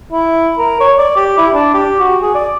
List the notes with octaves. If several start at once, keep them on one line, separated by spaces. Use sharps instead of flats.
E4
A#4
C#5
D5
G4
E4
D4
G4
F#4
G#4
D5